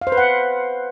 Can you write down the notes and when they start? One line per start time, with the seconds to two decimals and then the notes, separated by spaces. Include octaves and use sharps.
0.02 F5
0.07 C5
0.12 B4
0.17 F#5